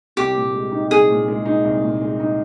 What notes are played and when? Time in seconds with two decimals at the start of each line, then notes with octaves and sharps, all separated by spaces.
0.17 C2 G4
0.36 A#2
0.54 G#3
0.72 D#4
0.90 C2 G#4
1.10 A#2
1.28 G#3
1.46 D#4
1.65 C2
1.83 A#2
2.02 G#3
2.20 D#4